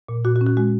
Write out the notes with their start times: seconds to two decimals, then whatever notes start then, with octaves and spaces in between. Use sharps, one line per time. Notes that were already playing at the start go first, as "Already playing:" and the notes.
0.09 A#2
0.25 A#2 F#4
0.36 F#4
0.41 C#4
0.46 F#4
0.57 G#3 F#4